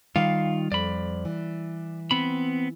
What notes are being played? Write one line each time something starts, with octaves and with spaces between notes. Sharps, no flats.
D#3 G3 F4 F5
F2 D5 B5
E3
B3 C4 B5